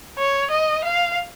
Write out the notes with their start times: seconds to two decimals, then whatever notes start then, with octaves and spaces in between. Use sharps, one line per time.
0.18 C#5
0.51 D#5
0.84 F5